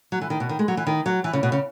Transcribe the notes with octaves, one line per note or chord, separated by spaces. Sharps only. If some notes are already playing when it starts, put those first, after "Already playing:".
F#3
E3
D#3
B2
D#3
G#3
F#3
E3
D#3
F#3
E3
C#3
B2
C#3